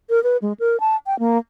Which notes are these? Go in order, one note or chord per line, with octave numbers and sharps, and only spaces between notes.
A#4
B4
G#3
A#4
A5
G5
A#3